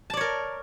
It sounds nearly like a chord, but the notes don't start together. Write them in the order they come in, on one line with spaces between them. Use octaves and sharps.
A5 D5 C#5 A#4